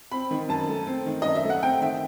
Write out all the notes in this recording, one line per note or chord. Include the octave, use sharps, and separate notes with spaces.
C4 B5
D#3
F#2 A5
A3
C4
D#3
F#2 D#5
E5
A3
F#5
C4 G5
D#3 E5